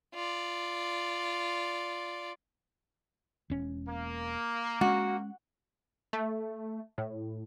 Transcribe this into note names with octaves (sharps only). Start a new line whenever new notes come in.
F4 D5
E1 C#4
A#3
G#3 C#4 F#4
A3
A2